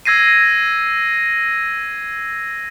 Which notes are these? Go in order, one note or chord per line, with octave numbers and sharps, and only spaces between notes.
E6 G#6 A#6 C7 D#7